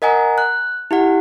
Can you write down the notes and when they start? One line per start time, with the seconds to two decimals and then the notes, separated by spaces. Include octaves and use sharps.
0.02 A#4 D#5 F#5 G#5 A#5
0.38 F#6
0.91 E4 G4 F#5